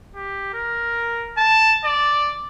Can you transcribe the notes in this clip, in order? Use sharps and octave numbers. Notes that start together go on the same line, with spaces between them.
G4
A#4
A5
D5